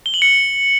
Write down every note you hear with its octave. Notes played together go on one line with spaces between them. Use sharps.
G7
F#7
C#7